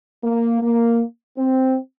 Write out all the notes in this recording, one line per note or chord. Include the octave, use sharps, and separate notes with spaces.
A#3
A#3
C4